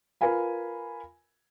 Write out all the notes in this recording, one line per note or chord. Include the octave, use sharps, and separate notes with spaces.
F4 A#4 B4 F5 G#5 B5